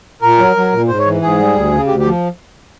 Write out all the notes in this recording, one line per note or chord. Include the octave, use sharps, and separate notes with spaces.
A#2 A#4
F#3
F#3
A#2
G#2 C5
C#5
E3
G#2 G#4
G3
D2
C#3
D2 G4
G4
F3